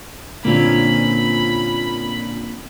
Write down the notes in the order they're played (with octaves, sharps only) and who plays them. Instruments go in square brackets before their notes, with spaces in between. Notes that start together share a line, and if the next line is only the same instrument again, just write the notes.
[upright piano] A#2 D3 [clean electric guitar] A#3 C4 C#4 [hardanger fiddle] B5